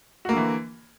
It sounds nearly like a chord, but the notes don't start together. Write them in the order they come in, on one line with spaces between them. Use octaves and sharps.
F#4 A#3 D3 E3